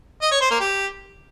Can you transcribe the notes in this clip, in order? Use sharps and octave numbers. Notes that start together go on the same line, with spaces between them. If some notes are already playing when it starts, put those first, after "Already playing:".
D#5
C#5
C5
A#3
G4